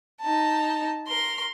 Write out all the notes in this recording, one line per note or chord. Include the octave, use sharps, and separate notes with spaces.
D#4 A5
A#4 C6